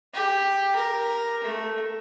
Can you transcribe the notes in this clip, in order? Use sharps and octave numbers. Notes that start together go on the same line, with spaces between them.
G4
A#4
A3